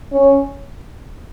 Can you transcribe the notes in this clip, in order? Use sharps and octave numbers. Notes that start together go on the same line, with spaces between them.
C#4